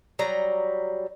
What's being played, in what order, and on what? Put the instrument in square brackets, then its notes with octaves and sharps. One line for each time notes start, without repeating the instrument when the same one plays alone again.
[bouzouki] F#3 G3 A#5